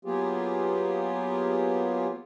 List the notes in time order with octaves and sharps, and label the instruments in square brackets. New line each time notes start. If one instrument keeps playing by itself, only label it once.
[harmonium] F#3 A#3 B3 F4 G4 G#4